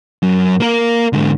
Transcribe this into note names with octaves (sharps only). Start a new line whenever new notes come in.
F#2
A#3 A#4
G#2 D3